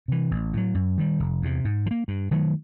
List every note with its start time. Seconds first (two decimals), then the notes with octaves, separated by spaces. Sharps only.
0.08 C3 E3
0.31 A1
0.53 A2 F#3
0.75 F#2
0.98 D#3 G3
1.20 F1
1.42 E2 C3
1.65 G#2
1.86 F3
1.91 A#3
2.08 G2
2.31 D#3 F#3 A3